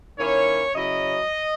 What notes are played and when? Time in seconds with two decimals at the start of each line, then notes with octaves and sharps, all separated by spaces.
0.17 D#3 A#3 C#4 E4 C#5
0.74 C#3 F#3 C#4 E4 D#5